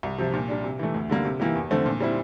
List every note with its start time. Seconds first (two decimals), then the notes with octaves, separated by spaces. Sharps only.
0.03 C2
0.18 C3 F3
0.34 A#2
0.48 G3 D4
0.64 C3
0.79 E3 A3
0.94 D2
1.09 D3 G3 A#3
1.25 C3
1.40 E3 A#3 E4 G4
1.55 E2
1.71 D3 F3 A3 C4
1.86 A#2
2.01 G3 C4 E4